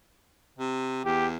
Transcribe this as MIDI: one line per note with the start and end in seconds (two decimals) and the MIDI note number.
0.59 1.02 48
1.05 1.37 40
1.05 1.27 67